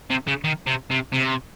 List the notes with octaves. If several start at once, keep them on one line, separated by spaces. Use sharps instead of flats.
C3
C#3
D#3
C3
C3
C3